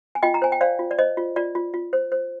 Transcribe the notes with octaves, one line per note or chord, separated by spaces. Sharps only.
G#5
F4 D#5 G5
A#5
C5 G#5
G5
C5 D5 F5
F4
D5
C5 D#5
F4
F4 D5
F4
F4
C5
C5